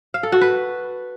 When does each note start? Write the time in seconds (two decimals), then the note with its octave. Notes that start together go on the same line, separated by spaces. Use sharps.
0.14 F5
0.23 A4
0.32 F#4
0.41 B4